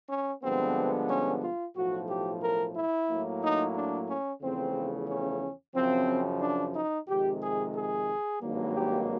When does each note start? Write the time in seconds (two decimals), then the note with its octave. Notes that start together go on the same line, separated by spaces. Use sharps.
0.09 C#4
0.42 G2 D3 F3 G#3 B3 C4
1.09 C#4
1.42 F4
1.76 B1 A2 F3 F#4
2.08 G4
2.42 A#4
2.76 E4
3.08 A2 F#3 A#3
3.42 D#4
3.75 D4
4.09 C#4
4.42 E2 C#3 F3 A3 C4
5.08 C#4
5.75 F#2 C#3 F3 C4
6.41 D4
6.75 D#4
7.08 F2 C3 D#3 G#3 G4
7.41 G#4
7.75 G#4
8.41 G#1 G2 D#3 F#3 A#3
8.74 G4